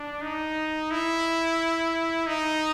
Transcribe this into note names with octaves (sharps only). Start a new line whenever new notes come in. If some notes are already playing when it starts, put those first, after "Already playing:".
Already playing: D4
D#4
E4
D#4